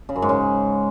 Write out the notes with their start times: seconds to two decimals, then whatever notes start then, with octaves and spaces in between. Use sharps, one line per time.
0.09 C#3
0.16 F#2
0.22 G#2
0.29 C#3